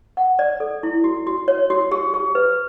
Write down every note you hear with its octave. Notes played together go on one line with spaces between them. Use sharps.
F#5
D5
A4
E4
F#4
F#4
C#5
F#4
G4
G4
B4